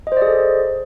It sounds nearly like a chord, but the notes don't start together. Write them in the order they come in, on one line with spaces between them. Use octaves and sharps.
D#5 C5 D5 G#4 A4